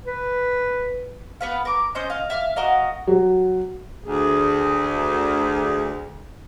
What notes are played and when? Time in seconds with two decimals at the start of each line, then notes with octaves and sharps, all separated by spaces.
0.05 B4
1.41 B3 B4 F5
1.65 A#4 D6
1.95 C#4 C5 D#5 G6
2.10 D#5 F5
2.30 E5 F5 F6
2.56 F#4 A#4 D#5 F5
3.07 F#3
4.05 D2 G#4